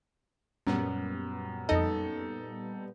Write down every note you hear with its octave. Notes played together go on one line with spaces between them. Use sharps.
F#2 A#2 G3 B3
F2 D#4 A4 D#5